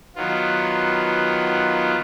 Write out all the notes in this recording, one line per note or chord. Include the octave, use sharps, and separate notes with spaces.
D#3 F#3 B3 F4